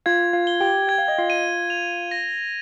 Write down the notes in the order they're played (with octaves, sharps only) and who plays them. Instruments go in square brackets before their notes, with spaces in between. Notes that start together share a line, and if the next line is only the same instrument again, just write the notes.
[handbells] F4 F5 [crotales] G#6
[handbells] F4 F5
[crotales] G7
[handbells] G4 G5
[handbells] G5 [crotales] G#6
[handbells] F5
D#5
F4 F5
[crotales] D#7
F7
A#6